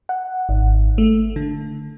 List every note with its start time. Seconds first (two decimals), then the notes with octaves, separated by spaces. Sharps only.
0.09 F#5
0.49 G#1
0.98 A3
1.36 D3